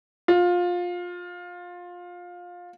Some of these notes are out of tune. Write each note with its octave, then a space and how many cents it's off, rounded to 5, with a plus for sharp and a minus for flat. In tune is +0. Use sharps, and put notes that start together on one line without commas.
F4 +20